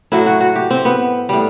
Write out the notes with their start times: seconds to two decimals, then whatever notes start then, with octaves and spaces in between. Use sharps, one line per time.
0.12 A2 F#3 E4
0.26 F#4
0.41 F#4
0.56 G4
0.71 C4
0.85 B3
1.29 A2 G3